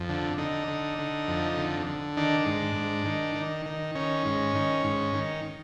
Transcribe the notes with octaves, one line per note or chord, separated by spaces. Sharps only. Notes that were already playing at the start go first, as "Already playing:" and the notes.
Already playing: F2
D3
D3 D#4
D3
D3
F2
D3
D3
D#3 D4
G#2
G#2
D#3
D#3
D#3
D#3 C#4
G#2
D#3
G#2
D#3